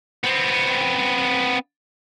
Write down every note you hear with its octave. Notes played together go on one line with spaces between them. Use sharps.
B3 C4